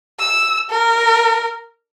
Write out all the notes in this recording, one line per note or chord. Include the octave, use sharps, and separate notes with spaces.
E6
A#4